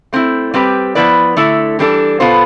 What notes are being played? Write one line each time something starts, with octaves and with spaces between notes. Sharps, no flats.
A3 C4 E4
G3 C4 G4 B4
F3 B3 E4 B4 D5
D3 A3 E4 A4
E3 G3 D4 A4
B2 B3 F4 A4 C5